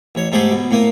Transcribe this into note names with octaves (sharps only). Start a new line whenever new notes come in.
A1 C#5
G#2 A3 G4 G#4
B2
A2 A#3 D#6